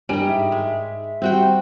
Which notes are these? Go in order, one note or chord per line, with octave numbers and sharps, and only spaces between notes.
G2 G3 A#4 D#5 G#5 D7
G#2 E5
G#3
G3 C4 F#4 G5